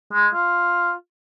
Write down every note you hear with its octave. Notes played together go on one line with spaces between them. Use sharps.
G#3
F4